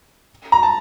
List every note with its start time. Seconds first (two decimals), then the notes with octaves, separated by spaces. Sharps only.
0.52 A#5
0.63 A5